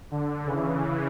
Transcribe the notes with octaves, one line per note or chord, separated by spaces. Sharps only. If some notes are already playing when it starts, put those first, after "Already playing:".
D3
C#3 E3